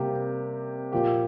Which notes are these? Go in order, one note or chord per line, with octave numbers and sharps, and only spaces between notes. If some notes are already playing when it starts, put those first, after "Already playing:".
Already playing: C3 G3 A#3 G4
A#2 F3 A#3 G4